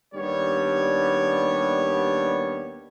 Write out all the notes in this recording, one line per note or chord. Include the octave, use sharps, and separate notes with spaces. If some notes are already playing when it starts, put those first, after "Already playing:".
D#2 G3 B3 D4 C#5